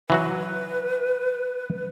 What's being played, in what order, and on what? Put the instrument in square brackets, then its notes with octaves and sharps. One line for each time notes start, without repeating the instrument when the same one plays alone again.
[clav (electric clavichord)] E3 F#3 F#4 [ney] B4